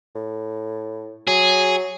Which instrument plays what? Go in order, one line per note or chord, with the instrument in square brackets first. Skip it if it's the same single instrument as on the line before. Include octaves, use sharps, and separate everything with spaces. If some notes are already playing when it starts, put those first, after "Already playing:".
[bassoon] A2
[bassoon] F#3 [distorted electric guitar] G#4